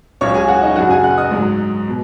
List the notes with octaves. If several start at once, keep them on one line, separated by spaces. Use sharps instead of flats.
C#2 C#3 F#3 C#5 C#6
G#4 G#5
F#4 F#5
D#4 D#5
F#2 C#3 F#3 F#4 F#5
G#4 G#5
F#5 F#6
D#5 D#6
G#2 F#3
B2